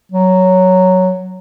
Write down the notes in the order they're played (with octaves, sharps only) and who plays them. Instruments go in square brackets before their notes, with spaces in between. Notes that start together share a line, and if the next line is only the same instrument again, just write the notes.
[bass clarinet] F#3